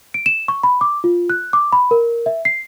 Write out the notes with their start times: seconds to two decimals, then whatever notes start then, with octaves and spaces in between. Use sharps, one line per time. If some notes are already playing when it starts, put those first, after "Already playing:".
0.14 D7
0.26 E7
0.48 C#6
0.63 B5
0.81 D6
1.04 F4
1.30 F#6
1.53 D6
1.72 B5
1.91 A#4
2.26 E5
2.45 C7